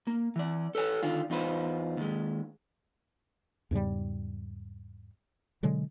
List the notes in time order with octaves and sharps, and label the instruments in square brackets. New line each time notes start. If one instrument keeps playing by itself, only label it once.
[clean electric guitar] A#3
E3 D5
A4 B4 C#5 G#5
D3 D#3 D4 F4
E2 D#4 F4 B4 C5
D#2 G#3
[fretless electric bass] E2 G#2 C#3 G3
B2 D3 F#3 G#3